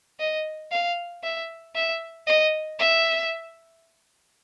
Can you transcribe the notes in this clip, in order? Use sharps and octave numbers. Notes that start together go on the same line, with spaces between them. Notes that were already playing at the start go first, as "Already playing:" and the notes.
D#5
F5
E5
E5
D#5
E5